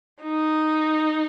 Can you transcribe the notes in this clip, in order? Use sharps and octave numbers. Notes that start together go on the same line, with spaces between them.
D#4